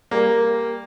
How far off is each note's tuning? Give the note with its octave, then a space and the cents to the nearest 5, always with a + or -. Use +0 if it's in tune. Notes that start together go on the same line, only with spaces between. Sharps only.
G3 +20 A#3 +0